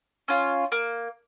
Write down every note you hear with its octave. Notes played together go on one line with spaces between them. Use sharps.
C#4 F4
A#3